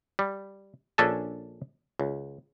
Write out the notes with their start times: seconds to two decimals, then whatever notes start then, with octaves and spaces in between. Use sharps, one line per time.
0.19 G3
0.98 A#1 C#4 D4 A4 G#5 A5
1.99 C#2